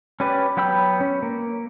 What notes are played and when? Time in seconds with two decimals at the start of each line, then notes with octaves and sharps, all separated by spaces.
0.20 C#4 G4 B4 D5
0.57 F#3 B3 G5 B5 E6
1.01 C#4
1.23 A#3